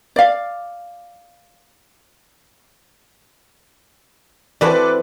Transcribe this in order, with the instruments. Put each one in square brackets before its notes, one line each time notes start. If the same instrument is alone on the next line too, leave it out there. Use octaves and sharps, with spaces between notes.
[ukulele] D5 F5
[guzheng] E3 C4 F#4 [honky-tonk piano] A4 B4 D5